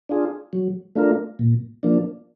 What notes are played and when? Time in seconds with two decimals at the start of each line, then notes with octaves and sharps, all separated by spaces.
0.09 D4 F4 G#4
0.53 F#3
0.95 A3 D4 F4 A#4
1.39 A#2
1.83 F3 A#3 D4